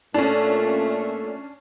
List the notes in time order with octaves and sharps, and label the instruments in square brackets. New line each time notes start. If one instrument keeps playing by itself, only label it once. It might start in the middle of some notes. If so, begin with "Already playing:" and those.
[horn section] A#2 A3 [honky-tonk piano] C#4 D4